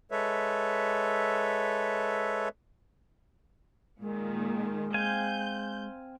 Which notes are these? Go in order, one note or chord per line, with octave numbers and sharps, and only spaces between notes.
G#3 A4 B4 C#5 E5
A#2 D#3 G#3
C4 F5 G#5 G6